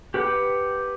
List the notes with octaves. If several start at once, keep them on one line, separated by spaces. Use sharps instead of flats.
G4 B4 F#5 D6